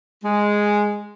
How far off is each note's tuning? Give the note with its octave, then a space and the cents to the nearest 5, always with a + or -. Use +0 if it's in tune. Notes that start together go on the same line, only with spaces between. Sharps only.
G#3 -5